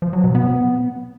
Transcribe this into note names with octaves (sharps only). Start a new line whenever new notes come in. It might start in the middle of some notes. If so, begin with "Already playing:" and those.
F3
F#3
B2
B3